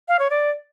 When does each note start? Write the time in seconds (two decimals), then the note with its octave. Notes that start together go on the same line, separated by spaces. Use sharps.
0.08 F5
0.19 C#5
0.30 D5